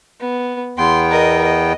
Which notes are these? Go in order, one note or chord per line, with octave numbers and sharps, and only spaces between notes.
B3
E2 B3 G5 C6
A#4 D#5
D#5